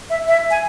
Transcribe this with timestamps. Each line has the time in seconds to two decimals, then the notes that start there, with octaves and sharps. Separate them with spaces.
0.10 E5
0.28 E5
0.50 G#5